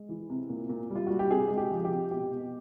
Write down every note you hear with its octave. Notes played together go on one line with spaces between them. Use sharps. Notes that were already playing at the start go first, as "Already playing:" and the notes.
Already playing: G#3
E3
C3
A#2
A#2
G3
F4
G3 F#4
G4
C3 G#4
G#3
G4
F3
G4
C3
B2 G4
B2